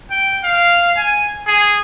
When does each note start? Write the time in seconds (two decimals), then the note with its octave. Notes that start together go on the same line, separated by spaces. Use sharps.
0.11 G5
0.43 F5
0.97 G#5
1.47 G#4